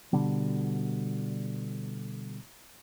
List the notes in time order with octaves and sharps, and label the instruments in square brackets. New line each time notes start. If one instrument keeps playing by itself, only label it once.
[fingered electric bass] B2 D3 G3